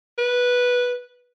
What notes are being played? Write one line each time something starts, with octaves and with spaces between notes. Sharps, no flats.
B4